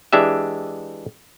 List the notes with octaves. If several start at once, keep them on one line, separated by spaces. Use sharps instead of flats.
E3 G#3 D4 G4 E5